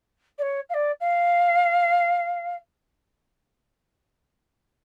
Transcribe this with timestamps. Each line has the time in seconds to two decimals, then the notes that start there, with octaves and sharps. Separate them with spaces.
0.38 D5
0.42 C#5
0.69 F5
0.74 D5
1.00 F5